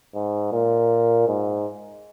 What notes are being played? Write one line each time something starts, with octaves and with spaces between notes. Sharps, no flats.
G#2
A#2
G#2